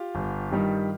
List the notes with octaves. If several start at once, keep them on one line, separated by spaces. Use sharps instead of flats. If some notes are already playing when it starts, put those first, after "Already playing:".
Already playing: F4 G4
G1
G2 D#3 G3